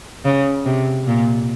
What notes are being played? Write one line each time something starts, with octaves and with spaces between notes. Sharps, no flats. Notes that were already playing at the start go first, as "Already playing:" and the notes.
C#3
C3
A#2